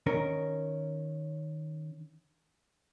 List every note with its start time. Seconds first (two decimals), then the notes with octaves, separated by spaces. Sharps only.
0.06 D#3 C#4 A#4